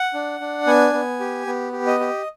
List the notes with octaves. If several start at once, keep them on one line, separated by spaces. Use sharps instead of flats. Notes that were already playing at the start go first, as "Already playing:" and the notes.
Already playing: F#5
D4
D4
B3 G#5
B3
G4
B3
G4
D#5
G4